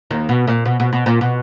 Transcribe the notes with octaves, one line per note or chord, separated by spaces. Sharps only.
D#2 D#3
B2
A#2
B2
B2
B2
A#2
B2